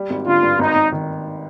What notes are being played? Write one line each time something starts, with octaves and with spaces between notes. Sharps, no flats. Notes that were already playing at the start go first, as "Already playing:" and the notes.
Already playing: G3
G#1
D3 F4
G2
G#1 D#4
G#1
D#3